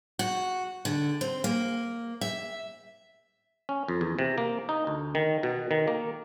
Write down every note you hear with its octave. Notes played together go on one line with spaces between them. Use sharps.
F#4
D3
C4
A#3
E5
C#4
F2
E2
C3
A#3
D#4
D2
D#3
B2
D#3
A#3